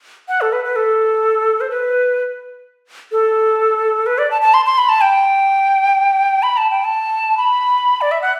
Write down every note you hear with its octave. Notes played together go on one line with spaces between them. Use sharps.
F#5
A4
B4
B4
A4
C5
B4
A4
B4
D5
A5
A5
C6
C6
B5
A5
G5
B5
A5
G5
A5
B5
D5
E5
F#5